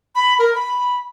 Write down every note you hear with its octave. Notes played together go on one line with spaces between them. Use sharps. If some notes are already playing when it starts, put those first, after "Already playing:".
B5
A#4
B5